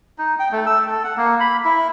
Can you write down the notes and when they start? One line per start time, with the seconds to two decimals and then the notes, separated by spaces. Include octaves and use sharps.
0.18 D#4
0.39 G5
0.52 A3
0.66 E6
0.87 A4
1.04 F#5
1.17 A#3
1.40 B5
1.65 E4